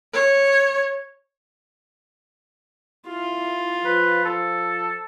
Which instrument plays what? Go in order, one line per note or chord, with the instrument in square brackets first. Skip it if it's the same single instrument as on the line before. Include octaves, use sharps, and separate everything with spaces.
[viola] C#5
[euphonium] E4 [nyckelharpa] F4
[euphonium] F3 [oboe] B4
[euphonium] F3 [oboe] A4